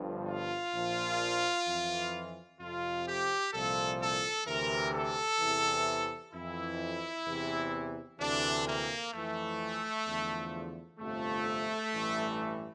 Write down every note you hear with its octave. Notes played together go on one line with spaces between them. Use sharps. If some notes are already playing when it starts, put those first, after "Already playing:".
Already playing: G1 G2 F3
F4
A#1 A#2 F3
F2 E3
F2 C3 F3 F4
G4
C2 A#2 F3 A4
A4
D2 C3 E3 A#4
A4
E2 C3 E3
F2 E3 E4
E2 C3 E3
D2 C3 E3 D4
A#3
F2 E3 A3
E2 D3 F3
G1 F2 C3 F3 A3
A1 G2 E3